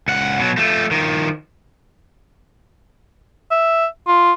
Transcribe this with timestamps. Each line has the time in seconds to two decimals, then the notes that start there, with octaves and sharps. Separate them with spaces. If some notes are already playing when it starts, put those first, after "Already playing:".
0.08 C#2 F#5
0.39 B2 F#3
0.57 F3 A3
0.91 D#3 F3
3.51 E5
4.07 F4